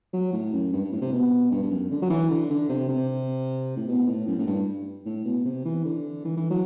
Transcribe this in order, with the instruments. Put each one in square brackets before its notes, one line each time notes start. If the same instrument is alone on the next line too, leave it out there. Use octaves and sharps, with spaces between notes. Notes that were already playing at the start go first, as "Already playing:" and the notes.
[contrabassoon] F#3
A2
F#2
G2
G2
A2
C3
B2
G2
G2
F#2
D3
F#3
E3
D3
D3
C3
C3
A2
B2
A2
F#2
A2
G2
A2
B2
C3
E3
D3
E3
E3
F#3